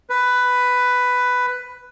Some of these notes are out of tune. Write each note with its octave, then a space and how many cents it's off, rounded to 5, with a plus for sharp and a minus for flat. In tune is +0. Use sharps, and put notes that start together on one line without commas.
B4 +10